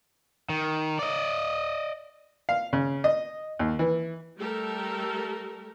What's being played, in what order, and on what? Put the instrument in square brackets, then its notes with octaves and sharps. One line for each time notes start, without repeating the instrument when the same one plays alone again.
[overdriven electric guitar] D#3
D5 D#5
[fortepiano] F5
C#3
D#5
D#2
E3
[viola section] G3 A3 G4 A4 A#4